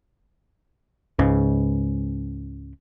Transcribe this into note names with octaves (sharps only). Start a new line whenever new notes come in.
C#2 G#2 C#3